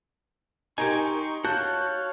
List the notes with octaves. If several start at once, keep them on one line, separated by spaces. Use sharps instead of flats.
D#4 G4 A#4 G#5 C6 C#6
F#4 C#5 F5 A5 F#6 G6